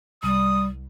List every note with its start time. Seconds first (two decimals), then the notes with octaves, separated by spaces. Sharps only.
0.23 C2 G3 D#6